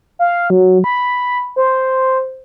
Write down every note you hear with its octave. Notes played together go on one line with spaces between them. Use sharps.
F5
F#3
B5
C5